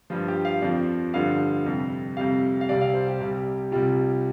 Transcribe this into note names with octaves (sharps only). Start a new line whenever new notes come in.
G2 F3 F4
G4
F5
F2 F3 D5
G2 D3 F3 F5
F2 C3 G3
F2 C3 G3 F5
F5
C2 C3 G3 D5
F5
C5
G4
C2 C3 G3
C2 C3 G3 F4